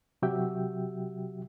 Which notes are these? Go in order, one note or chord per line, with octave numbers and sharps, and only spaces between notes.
C3 F#3 F#4 G4 E5 G5